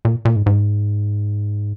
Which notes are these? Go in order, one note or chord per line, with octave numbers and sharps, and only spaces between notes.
A#2
A#2
G#2
G#2